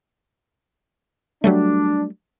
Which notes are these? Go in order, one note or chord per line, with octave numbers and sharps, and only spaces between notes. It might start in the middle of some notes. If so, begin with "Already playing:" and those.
F#3 G3 A3 D4